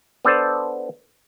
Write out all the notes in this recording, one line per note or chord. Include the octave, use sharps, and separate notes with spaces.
B3 D4 A4 C5 D5 A5